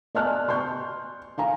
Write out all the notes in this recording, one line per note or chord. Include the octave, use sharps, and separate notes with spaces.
D5 D#5 G#5 A5 F6 F#6
C6 C#6 G6
F5 G#5 A#5